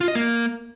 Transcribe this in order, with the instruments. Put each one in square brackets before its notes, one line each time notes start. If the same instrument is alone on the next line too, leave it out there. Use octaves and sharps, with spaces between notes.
[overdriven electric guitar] F4
D#5
A#3